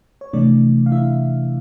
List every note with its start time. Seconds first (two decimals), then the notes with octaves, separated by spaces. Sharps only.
0.21 C#5
0.33 C3 E3 A3 D4 D5
0.86 F5
0.92 E4 E5